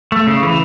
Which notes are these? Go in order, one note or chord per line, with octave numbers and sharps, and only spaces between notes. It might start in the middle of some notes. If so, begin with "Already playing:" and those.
A3
C#3
E3